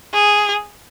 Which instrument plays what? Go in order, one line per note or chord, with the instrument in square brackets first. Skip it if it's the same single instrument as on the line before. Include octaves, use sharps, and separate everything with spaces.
[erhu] G#4